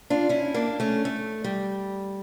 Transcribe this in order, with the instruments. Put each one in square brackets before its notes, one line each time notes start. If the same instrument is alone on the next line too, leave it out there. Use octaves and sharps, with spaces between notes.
[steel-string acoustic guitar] D4 F4
C#4 E4
A#3 D4
A3 C#4
A3
G3